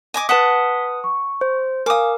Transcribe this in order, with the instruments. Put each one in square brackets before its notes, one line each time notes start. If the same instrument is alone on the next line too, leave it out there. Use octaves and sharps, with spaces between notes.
[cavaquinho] D#5 G#5 D6
[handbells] B4 D#6 [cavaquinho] F#5 A5 [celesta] B6 G7
[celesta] C#6
[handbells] C5
[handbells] A#4 [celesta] F5 G#5 [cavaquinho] D6 D#6